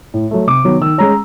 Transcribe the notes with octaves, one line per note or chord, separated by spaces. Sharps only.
A2
F#3 A3
C3 D6
D#3 F#3 B3
D#3 E6
G#3 C#4 A#5